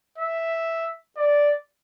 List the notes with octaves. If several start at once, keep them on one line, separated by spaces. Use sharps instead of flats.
E5
D5